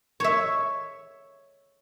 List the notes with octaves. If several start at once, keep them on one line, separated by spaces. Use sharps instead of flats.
C#5 E5